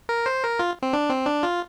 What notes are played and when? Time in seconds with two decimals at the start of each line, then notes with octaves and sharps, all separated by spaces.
0.09 A#4
0.26 C5
0.43 A#4
0.59 F4
0.83 C4
0.93 D4
1.09 C4
1.26 D4
1.43 F4